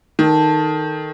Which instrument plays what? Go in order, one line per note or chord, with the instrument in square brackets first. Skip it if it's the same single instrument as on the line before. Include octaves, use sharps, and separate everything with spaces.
[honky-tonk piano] D#3 [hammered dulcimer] A4